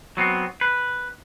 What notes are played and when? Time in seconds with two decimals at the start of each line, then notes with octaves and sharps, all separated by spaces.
0.17 F#3 B3 C4
0.61 B4